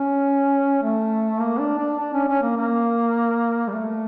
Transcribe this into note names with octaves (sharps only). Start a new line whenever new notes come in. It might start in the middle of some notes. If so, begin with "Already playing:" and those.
Already playing: C#4
A3
A#3
D4
D4
D4
C#4
C#4
A#3
A#3
G3
A3